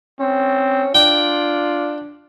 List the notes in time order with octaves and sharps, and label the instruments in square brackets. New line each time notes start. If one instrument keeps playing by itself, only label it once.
[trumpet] C4 [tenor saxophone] C#4
[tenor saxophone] D4 [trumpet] F4 [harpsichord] G5